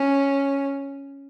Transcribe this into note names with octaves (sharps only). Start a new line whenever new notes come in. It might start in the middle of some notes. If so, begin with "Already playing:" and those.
Already playing: C#4